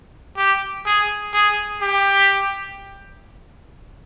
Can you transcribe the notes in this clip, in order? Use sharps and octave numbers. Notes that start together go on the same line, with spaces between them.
G4
G#4
G#4
G4